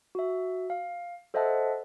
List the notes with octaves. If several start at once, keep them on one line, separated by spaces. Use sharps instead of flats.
F#4 E5
F5
A4 C5 D#5 E5 F#5 A5